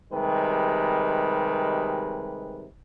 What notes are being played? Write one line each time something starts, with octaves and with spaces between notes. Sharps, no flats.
C3 D#3 G3 G#3 B4